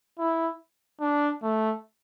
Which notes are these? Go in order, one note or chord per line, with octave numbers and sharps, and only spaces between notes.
E4
D4
A3